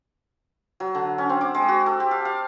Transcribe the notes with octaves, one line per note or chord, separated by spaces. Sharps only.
F#3
D3
C#4
C4
D6
G#3
F#4
A4
G4
F5
F5